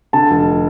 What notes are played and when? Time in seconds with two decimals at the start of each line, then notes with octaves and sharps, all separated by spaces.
0.13 D3 A5
0.31 F1